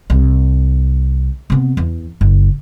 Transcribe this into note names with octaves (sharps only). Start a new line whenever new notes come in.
C2
C3 B3
E2
F#1